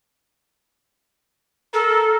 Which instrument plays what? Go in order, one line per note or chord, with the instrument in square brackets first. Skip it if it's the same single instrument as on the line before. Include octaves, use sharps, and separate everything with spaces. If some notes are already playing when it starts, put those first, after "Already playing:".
[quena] A4 [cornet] A#4